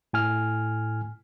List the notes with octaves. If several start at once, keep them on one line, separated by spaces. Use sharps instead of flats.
A2 G#5 F6